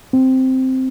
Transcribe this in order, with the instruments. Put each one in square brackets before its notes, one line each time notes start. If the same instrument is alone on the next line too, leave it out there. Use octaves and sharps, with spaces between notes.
[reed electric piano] C4